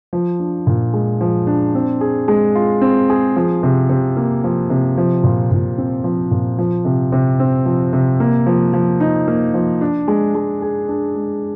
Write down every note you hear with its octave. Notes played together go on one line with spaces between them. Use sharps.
F3
D4
A#2
G#3
F3
D4
C4
G#4
G#3
F4
C4
G#4
F3
C3
C3
A#3
F3
C3
F3
A#2
A#2
C4
F3
A#2
F3
C3
C3
C4
F3
C3
A#3
F3
F3
D#4
A#3
F3
D4
G#3
G#3
G#4
D4
G#3